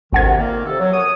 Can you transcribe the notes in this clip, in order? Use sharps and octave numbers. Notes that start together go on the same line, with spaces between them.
G#1 D2 C3 D#3 F#5 G#6
A#2 D#3 A#3
C3 A4
F#3
F#2 C#5 D#6